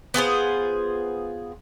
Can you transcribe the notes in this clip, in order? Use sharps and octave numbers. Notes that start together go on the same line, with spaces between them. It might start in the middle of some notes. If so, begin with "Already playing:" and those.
B3 F4 G#4 C5